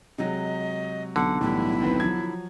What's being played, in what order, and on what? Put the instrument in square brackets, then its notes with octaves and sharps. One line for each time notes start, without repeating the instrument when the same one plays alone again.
[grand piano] C3 F#3 G#3 [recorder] D#5
[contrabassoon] B1 [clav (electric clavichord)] D3 [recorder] F#5
[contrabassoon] B1 [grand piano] A2 E3 G3 [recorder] E4
[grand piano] D#2 C4 B4
F3 F#3 G#6